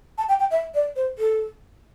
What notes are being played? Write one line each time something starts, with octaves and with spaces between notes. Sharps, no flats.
A5
G5
G5
E5
D5
C5
A4